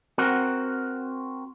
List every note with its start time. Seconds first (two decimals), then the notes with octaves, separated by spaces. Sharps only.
0.18 C4 F#4 A#4 F#5